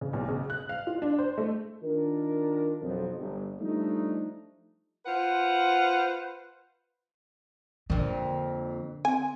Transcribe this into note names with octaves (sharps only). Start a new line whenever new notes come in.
C#3
B1
C#3
F#6
F5
F4
D4
C5
A3
D#3 D4 F4 A#4
B1 F2
G1
F3 G3 A3 D4 D#4
F4 B4 C5 F#5
F2 A#2 D3
C4 G#5